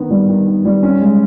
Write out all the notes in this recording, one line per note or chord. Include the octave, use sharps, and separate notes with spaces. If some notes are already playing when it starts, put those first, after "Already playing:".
Already playing: D#3 B3
G3
D#3
D#3
G3
C#4
G#3